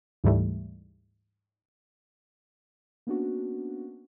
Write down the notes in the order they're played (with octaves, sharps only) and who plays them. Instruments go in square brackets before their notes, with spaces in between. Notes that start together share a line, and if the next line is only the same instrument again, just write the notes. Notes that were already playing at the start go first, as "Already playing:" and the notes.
[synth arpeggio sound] D2 G#2 E3 G3 A3
[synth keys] A#3 B3 C#4 D4 F#4